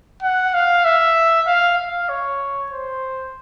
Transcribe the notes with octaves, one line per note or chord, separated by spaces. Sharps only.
F#5
F5
E5
F5
F5
C#5
C5